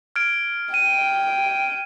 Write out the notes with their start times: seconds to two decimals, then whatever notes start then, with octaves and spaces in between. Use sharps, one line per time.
0.16 F6 G#6 D7
0.74 G5 D#7